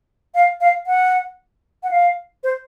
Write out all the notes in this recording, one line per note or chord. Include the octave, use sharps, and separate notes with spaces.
F5
F5
F#5
F#5
F5
C5